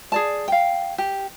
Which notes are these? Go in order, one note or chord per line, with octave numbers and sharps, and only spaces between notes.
G#4 D5 A5
F5 G5
G4